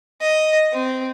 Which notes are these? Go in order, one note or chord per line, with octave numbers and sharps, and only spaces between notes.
D#5
C4